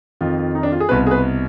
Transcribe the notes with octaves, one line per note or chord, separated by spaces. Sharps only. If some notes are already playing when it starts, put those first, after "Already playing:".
F2 D#3 F4
F4
D#4
D4
F4
G#4
C2 B2 B4
G#4
B4